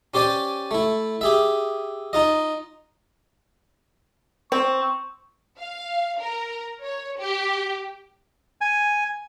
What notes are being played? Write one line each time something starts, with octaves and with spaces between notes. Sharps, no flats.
C#4 G4 C5 D5 G#5
A3 E4
G4 G#4 E5
D#4 F4 D#5
C4 C#6
F5
A#4
C#5
G4
G#5